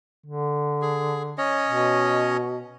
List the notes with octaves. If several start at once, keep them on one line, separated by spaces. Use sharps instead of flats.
D3
G#4
C#4 C#5 D#5
B2